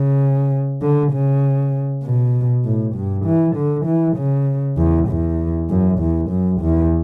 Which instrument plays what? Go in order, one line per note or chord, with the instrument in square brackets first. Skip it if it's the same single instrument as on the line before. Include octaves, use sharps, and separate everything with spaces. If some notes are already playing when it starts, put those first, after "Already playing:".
Already playing: [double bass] C#3
D3
C#3
B2
A2
G2
E3
D3
E3
C#3
E2
E2
F#2
E2
F#2
E2